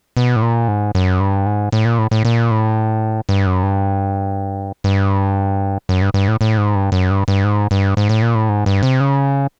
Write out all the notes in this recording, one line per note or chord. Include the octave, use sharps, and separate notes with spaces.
B2
A2
A#2
G#2
F#2
G2
G#2
A2
A#2
A2
A2
A#2
A2
G2
F#2
G2
G2
F#2
G2
G2
A2
A2
G#2
G2
F#2
G2
G2
G#2
G2
G#2
A2
A#2
A2
G#2
G2
C3
C#3